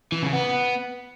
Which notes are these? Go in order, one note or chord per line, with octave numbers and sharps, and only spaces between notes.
E3
C#3
B3